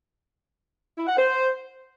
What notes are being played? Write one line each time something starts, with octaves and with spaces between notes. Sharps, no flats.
E4
F#5
C5